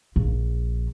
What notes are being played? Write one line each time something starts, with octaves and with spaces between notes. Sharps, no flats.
A#1